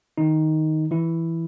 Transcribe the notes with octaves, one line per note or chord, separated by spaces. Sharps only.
D#3 D#4
E3 E4